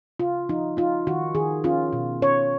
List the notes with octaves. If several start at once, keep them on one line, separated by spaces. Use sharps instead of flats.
C#3 F4
F3 D#4
D#4 F4
D#3 F#4
D#3 G#4
C#4 F4
B2
C#4 C#5